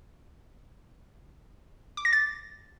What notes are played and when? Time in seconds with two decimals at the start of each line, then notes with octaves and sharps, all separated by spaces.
1.97 D6
2.05 A#6
2.13 A6